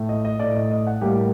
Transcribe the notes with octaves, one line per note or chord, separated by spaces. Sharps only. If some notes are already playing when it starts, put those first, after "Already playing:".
Already playing: A2 A3
D#5
D#5
A2 A3 D5
D#5
D#5
F#5
A2 G3 A#3 G4